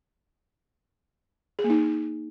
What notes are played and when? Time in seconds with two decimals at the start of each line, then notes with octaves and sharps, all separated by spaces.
1.59 G#4
1.64 A#3
1.70 D#4